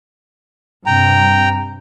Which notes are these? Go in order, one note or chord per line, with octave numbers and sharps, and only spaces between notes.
G2 C3 G5 A#5